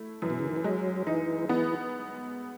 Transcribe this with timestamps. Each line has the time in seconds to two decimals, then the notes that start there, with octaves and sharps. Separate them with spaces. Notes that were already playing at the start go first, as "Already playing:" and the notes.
Already playing: A3 E4
0.22 F#2 E3
0.30 B2
0.39 C#3
0.48 D#3
0.56 E3
0.64 F#3 G#3
1.07 E3 D#4
1.49 E3 B3